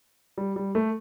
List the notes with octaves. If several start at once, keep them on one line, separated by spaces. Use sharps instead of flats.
G3
G3
A3